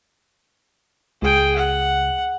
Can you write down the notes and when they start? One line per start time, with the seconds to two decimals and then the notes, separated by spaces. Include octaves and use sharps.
1.22 C#2 G#4 G5
1.56 F#5